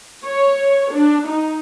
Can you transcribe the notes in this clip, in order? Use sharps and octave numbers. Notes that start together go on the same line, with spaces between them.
C#5
D4
D#4